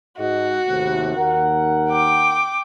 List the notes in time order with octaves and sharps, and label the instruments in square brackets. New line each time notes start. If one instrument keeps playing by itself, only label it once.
[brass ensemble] G#2 D#5 [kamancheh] F#4
[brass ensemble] D#2 A2 C3
D#2 A#4 F#5
[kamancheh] G5 D6